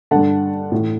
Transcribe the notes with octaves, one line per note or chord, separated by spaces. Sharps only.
G2 D3 F#5 A5
A2 E3